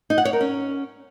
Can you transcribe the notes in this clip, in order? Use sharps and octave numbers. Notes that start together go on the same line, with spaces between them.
D#4
F#5
C#5
A#4
C#4